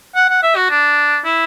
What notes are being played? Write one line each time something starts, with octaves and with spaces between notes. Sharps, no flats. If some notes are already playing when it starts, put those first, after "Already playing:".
F#5
F#5
E5
F#4
D4
E4